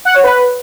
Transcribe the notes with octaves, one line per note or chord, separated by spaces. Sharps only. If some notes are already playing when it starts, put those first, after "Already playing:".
F#5
C#5
B4